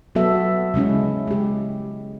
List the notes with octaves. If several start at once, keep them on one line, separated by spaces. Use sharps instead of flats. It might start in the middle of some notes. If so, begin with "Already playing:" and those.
F#3 B3 F#4 A4 E5
C#3 G#3 C#4 E4
G#3 G4